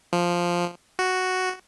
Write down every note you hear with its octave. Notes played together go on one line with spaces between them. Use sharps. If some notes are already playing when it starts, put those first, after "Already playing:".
F3
F#4